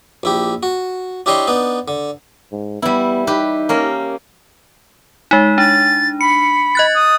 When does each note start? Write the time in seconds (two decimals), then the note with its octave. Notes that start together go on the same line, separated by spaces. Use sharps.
0.23 A#1 E4 G4
0.63 F#4
1.26 D4 E4 G4 C#5 D#5 C6
1.47 B3 D4 D#4
1.88 D3
2.52 G#2
2.82 G3 B3 E4
3.27 D#4 G4 B4
3.69 A#3 C#4 D#5
5.31 G#3 D#4
5.58 D4 A6
6.21 B5 C#7
6.75 D#5 F#6 A6
6.95 D#6